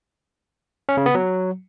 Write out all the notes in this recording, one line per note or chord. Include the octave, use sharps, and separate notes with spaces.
C#4
C#3
B3
F#3